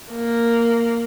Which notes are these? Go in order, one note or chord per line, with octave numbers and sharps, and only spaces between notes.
A#3